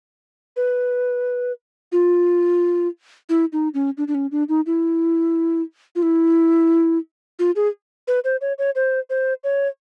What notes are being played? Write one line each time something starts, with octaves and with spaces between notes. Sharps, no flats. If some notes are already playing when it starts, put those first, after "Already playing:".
B4
F4
E4
D#4
C#4
D4
D4
C#4
D4
D#4
E4
F4
E4
F4
G#4
B4
C5
C#5
C#5
C5
C5
C#5